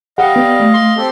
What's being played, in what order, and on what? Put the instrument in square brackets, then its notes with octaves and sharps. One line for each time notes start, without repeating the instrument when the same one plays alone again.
[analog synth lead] G3 [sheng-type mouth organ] D#5 F5 [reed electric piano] F#5
[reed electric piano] B3
A3
[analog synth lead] C6
[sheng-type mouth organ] C4 G4 A4